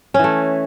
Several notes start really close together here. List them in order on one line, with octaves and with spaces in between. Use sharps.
C#4 E3 A3